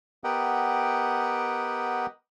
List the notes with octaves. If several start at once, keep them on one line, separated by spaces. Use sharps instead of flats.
B3 G4 A#4 D#5 F#5 G5